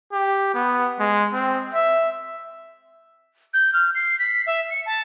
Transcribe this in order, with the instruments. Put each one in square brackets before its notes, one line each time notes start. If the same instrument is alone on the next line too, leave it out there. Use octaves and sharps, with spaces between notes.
[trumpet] G4
B3
G#3
C4
E5
[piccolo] G6
F6
C7
B6
E5
C#7
A5